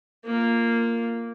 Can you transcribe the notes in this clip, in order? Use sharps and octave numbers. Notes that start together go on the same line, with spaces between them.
A#3 F4